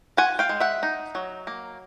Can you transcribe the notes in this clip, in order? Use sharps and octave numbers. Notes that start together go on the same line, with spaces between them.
F4 F#5 G#5
F5 G5
G#3
E5 F#5
D#4
F#3
A#3